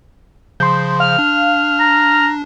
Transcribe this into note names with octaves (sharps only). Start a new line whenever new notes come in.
C#3 F3 C6 G6
F5 F6
D4
A#5